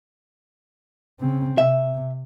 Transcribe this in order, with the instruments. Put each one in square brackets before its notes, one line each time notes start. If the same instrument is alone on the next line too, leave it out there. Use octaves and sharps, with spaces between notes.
[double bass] C#3 C4
[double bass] C3 [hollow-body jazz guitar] E5